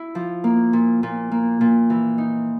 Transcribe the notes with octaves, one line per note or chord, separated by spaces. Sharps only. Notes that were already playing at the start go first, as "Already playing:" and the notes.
Already playing: E4
F3
A#3
A#2
A#2
A#3
A#2
E3
D#4